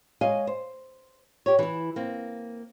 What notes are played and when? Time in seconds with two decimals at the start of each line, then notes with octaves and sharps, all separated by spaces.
0.21 G#3 C#5 D#5 F5 G#5
0.47 C5
1.46 G4 C#5
1.59 E3 E4
1.96 A#3 C4